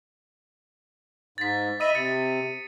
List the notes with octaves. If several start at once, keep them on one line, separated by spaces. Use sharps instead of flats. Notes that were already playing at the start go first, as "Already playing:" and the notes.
G#2 A6 B6
D#5 E5 B5 D#6 D#7
C3 A6 C#7